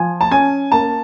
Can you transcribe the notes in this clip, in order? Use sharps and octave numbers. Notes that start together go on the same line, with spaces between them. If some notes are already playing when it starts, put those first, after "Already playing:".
Already playing: F3 G#5
A5
C#4 G#5
A#3 A5